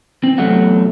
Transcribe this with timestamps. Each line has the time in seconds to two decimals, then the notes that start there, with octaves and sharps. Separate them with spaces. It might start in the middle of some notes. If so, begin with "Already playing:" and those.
0.23 C4
0.38 E2 C3 F#3 A3 F#5